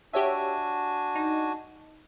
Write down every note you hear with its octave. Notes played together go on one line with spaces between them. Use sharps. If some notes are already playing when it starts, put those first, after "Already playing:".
D4 F#4 G4 C#5 E5 G#5
D#4